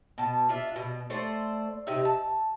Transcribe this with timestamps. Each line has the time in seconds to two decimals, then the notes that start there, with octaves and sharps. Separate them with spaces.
0.18 B2 A5
0.49 D4 F4 E5
0.76 B2
1.10 A3 C5 D5
1.87 C3 D#4 E5
2.05 A5